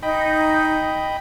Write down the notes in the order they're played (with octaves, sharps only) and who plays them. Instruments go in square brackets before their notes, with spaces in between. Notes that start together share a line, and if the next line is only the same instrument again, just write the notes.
[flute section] D#4 [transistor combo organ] D#5 G5 B5